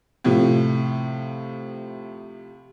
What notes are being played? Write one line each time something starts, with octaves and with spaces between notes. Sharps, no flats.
A2 C3 F3